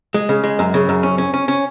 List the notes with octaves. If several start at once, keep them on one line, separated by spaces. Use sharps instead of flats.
G#3
C#3
G#3
F#2
C#3
F#2
C#4
C#4
C#4
C#4